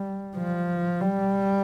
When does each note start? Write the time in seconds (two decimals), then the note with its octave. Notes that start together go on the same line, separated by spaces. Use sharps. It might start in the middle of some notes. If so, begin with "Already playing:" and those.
Already playing: G3
0.36 F3
1.01 G3